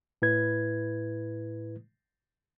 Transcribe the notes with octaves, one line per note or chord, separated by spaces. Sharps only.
A2 E4 B4 G#6